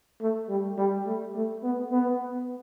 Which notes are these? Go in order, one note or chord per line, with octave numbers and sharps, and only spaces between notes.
A3
G3
G3
A3
A3
B3
B3